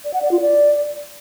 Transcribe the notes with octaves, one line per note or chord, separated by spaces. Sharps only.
D5
F#5
D5
F4
D5